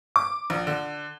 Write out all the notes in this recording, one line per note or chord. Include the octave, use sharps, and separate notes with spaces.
D6
A#1
D3